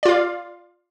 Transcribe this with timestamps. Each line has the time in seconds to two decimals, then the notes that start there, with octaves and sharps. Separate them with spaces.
0.03 D5
0.06 F4
0.08 F5